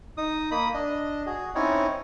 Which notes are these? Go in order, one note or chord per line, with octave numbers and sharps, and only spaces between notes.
D#4 D#6
A#3 B5 D#6
D4 D#5
F#4 G#4
C4 C#4 D#4 E4 C#5